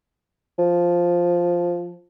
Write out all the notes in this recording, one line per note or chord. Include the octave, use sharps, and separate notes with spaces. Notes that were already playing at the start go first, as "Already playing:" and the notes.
F3